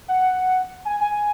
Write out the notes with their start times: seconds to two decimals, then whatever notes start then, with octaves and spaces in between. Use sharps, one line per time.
0.08 F#5
0.85 G#5
1.00 G#5